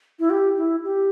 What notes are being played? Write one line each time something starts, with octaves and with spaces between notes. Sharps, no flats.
E4
G4
E4
G4